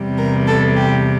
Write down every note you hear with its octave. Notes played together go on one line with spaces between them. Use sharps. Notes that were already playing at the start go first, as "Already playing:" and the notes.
Already playing: E2 C3 G3
A#4
A4
G4